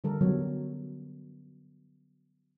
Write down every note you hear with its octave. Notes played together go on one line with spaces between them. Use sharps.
D3 G3 A4 A#4
D3 F#3 G3 B3 F#4 C#5